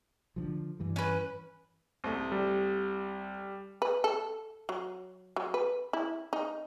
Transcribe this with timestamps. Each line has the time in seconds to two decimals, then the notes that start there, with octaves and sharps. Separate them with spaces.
0.36 D3 E3 F3
0.80 G2 E3 G3
0.96 C#4 B4
2.04 C2 A3
2.32 G3
3.82 B4
4.04 A4
4.69 F#3
5.36 F#3
5.54 B4
5.93 E4
6.33 D#4